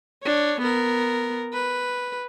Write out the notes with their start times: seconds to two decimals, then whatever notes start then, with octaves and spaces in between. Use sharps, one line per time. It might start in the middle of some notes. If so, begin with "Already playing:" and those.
0.23 D4 C#5
0.61 B3 A#4
1.54 B4